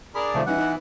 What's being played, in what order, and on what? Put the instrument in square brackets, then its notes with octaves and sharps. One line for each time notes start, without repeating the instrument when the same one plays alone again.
[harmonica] D4 A#4 D5 [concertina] G#4 [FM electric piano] B5
[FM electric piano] C3 D#3 [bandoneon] F3 A3
[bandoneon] E3 [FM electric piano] G3 C#4 D#4 [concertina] F#5
[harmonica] B3 E4 [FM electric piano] D#4